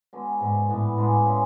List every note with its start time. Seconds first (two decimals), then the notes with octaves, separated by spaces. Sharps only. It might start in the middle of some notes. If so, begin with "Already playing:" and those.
0.13 D3 G#3 B3 F#4
0.40 G#2 D3 G#3 D4
0.68 A2 E3 B3 D4
0.97 A2 D3 G#3 D4
1.25 C#3 G#3